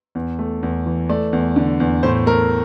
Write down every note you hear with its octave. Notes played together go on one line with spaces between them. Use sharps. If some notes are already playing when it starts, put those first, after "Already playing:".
E2
A3
E2
E3
A3 D5
E2
D3
E2
A2 C5
A3 A#4